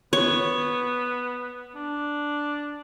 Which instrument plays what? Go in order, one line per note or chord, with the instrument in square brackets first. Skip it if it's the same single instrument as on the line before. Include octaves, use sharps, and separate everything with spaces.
[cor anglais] B3 [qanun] C#5
[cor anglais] D4